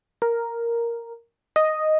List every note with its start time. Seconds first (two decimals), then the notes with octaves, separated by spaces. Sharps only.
0.22 A#4
1.56 D#5